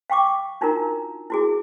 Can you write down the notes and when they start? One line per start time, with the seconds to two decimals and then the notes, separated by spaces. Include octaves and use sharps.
0.10 F5 G5 C#6 D6
0.61 D4 D#4 F4 F#4 A#4 A#5
1.30 E4 F#4 G#4